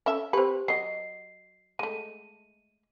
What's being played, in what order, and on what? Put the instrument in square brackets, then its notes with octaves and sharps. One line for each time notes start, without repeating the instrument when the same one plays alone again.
[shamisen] C#4 A4 E5
[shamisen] C4 B4 [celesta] G4 C5
[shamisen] F#3 D#5 [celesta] C7
[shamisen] G#3 A3 [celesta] D#7